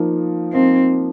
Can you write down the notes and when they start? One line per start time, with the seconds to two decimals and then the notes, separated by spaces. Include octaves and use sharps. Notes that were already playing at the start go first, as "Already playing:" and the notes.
Already playing: F3 A#3 D#4
0.53 F3 A#3 C4 D#4